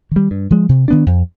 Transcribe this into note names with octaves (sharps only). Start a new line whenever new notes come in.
D#3 G3
G2
F3 G#3
C3
D#3 B3 D4
F2